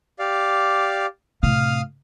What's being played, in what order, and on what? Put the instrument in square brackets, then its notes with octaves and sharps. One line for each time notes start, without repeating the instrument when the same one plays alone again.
[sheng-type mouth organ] G4 D5 F5
[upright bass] A2 C3 [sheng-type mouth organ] F5 D#6 F6